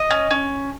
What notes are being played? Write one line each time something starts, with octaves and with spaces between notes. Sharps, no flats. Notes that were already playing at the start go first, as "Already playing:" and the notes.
Already playing: D#5
C#4
C#4